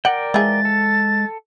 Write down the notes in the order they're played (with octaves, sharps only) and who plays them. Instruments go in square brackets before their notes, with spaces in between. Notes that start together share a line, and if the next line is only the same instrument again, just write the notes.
[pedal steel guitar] A#4 D5 G5 [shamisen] F#5
[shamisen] E3 F3 G#4 [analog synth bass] G#3 [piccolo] A6
[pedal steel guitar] A4